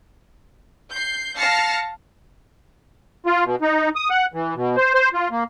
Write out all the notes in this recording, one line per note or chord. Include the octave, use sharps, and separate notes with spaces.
G6 C7
F5 A5 F6 A#6 C7 C#7
F4
B2
D#4
D#6
F#5
E3
B2
C5
C5
F4
A#3